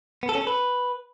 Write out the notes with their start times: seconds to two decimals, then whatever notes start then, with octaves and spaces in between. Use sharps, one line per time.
0.23 B3
0.29 A4
0.35 C#4
0.41 A4
0.47 B4